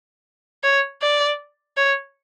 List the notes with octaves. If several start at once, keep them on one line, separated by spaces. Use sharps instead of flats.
C#5
D5
C#5